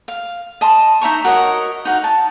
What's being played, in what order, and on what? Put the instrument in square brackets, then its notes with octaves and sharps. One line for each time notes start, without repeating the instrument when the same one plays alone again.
[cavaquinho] F5
D#5 A5 C6
D#4 E5 A#5 C#6
F#4 A#4 C#5 D#5
D#4 F#4 F5
A5